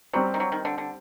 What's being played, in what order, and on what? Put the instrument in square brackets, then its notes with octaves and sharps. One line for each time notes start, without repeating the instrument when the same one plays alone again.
[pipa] F#3 [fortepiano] G3 C4 G4 C5
[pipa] D#3
F#3
D#3
D3
D3